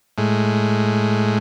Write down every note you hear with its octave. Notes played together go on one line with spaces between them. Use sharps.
A2 G#3